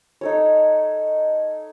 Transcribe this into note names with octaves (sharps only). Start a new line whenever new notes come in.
D#4 A4 C#5